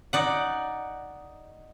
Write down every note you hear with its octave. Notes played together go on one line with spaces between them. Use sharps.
D#4 D5 F#5